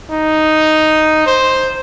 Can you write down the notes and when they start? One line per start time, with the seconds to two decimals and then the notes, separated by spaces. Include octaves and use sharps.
0.11 D#4
1.27 C5